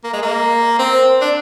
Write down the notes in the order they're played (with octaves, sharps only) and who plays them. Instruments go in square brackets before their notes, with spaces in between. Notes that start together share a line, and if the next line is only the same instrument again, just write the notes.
[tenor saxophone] A#3
G#3
A#3
C4
D4